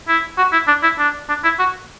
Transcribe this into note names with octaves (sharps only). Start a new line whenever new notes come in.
E4
F#4
E4
D4
E4
D4
D4
E4
F#4